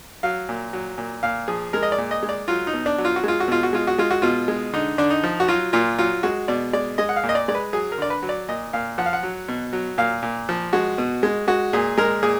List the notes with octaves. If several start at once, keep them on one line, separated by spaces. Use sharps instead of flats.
F#3 F5
A#2
F#3
A#2
A#2 F5
F3 G#4
G#3 A#4
D#5
D5
A#2
D#5
G#3
D5
F#3 F4
D#4
B2
D4
F#3
F4
F#4
G#3 F4
F#4
B2 F4
F#4
G#3 F4
F#4
G#3 F4
F#4
B2 F4
G#3
D3 D#4
D3 D4
D#4
F3
F#4
F#3 F4
A#2 F4
F#3 F4
G#3 F#4
B2 D5
G#3 D5
G#3 D#5
F#5
F5
A#2
D#5
D5
G#3 D5
B4
F#3 G#4
A#4
D3 D5
B4
F#3
D5
A#2 D#5
A#2 F5
F3 F#5
F5
F#5
F#3
B2
F#3
A#2 F5
A#2
F3
G#3 F#4
B2
G#3
G#3 F#4
A#2 G#4
G#3 A#4
A#2 G#4